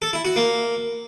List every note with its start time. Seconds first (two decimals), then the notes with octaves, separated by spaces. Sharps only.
0.02 A4
0.13 E4
0.25 F#4
0.36 A#3